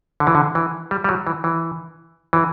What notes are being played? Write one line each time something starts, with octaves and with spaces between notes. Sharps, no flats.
D3
E3
D3
E3
G3
G3
F#3
E3
E3
E3